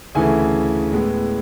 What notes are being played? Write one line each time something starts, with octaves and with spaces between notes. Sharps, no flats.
D2 C#3 E3 A3 G#5
A2 G#3 B3